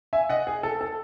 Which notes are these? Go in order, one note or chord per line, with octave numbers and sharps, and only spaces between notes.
E5 G#5
D#5 F#5
G#4
A4
A4